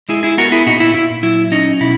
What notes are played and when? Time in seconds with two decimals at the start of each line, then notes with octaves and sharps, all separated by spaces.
0.09 G#3 E4 G#4
0.23 E4 G#4
0.38 B3 F#4 A#4
0.52 E4 G#4
0.66 A#2 D#4 F#4
0.80 E4
0.94 A#2 E4
1.23 F#3 E4
1.52 C#4 D#4
1.81 B2 E4